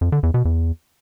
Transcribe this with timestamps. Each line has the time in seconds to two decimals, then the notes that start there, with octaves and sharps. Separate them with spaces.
0.01 F2
0.12 D3
0.23 E2
0.34 B2
0.45 E2